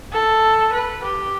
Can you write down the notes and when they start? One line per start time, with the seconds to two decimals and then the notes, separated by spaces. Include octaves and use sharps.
0.13 A4
0.73 B4
1.04 G4